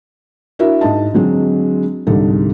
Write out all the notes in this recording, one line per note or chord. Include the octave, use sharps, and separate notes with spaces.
D4 E4 F#4 A#4 E5
G#2 D#5 A5
D3 F#3 G#3 C4
C2 G#2 D3 G3 A4